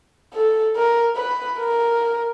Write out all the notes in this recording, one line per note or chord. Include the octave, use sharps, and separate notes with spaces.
A4
A#4
B4
A#4